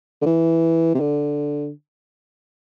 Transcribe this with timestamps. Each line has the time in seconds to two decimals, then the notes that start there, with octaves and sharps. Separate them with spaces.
0.22 D3
0.26 E3
0.95 C3
1.00 D3